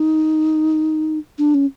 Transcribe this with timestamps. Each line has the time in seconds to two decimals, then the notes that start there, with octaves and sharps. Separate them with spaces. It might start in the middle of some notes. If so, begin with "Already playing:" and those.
Already playing: D#4
1.38 D4
1.54 C#4